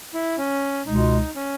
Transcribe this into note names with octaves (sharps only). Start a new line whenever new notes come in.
E4
C#4
C#2 B2 G#3 D#4
C#4